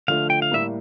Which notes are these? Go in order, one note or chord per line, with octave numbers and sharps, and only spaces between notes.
D3 F3 A3 F5
G5
F5
A2 G3 A#3 E5